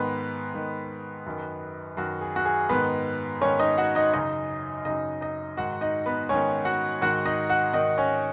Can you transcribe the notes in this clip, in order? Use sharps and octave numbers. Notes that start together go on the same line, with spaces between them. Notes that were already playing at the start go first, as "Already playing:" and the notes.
Already playing: G#2 D#3 B3 B4
G#2 D#3
F#2 D#3
F#2 D#3 F#4
G#4
F#4
G#4
G#2 D#3 B3 B4
G#2 D#3 C#4 C#5
D#4 D#5
F#4 F#5
D#4 D#5
F#2 C#3 D#4 D#5
F#2 C#3 D#4 D#5
D#4 D#5
G#2 D#3 F#4 F#5
D#4 D#5
B3 B4
G#2 D#3 C#4 C#5
F#4 F#5
G#2 D#3 F#4 F#5
D#4 D#5
F#4 F#5
G#2 D#3 D#4 D#5
C#4 C#5